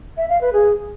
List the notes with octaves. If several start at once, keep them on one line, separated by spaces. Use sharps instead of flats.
E5
F5
B4
G#4